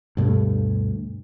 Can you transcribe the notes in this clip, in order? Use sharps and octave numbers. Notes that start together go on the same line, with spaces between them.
D2 G2 B2 A3